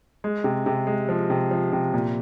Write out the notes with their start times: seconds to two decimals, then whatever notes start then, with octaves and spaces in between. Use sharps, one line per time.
0.24 G#3
0.44 C3
0.66 C3
0.87 G#3
1.09 F3
1.30 C3
1.51 F3
1.72 C3
1.94 A#2